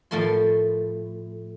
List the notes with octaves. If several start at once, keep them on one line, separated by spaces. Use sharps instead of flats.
A2 F3 A3 A#4 C6